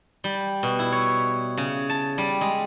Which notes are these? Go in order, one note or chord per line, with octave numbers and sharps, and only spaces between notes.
G3
B2
E4
C#5
C#3
A5
G3
G#3